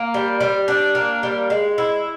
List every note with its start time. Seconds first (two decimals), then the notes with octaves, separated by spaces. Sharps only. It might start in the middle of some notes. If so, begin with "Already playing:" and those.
Already playing: A#3
0.14 G3
0.41 G3
0.68 D4
0.95 A#3
1.23 G3
1.50 G#3
1.78 E4